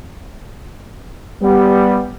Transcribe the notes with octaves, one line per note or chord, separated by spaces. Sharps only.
G3 B3